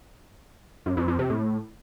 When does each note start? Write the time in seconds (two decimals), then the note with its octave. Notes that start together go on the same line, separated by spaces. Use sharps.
0.86 F#2
0.97 F2
1.08 F2
1.19 C3
1.30 A2